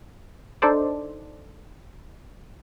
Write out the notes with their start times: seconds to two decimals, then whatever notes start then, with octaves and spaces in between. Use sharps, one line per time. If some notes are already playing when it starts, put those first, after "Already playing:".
0.62 D4 D#4 A4 C5 D5